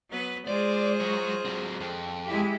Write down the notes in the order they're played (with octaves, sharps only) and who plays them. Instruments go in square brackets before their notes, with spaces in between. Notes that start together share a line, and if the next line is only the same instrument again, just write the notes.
[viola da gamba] F#3 B3 B4
[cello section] G#3 [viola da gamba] F4 G#4 C5 [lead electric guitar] D5
[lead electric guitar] F#3 C#5
F#3 C4
F2
[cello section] G#3 E4 G4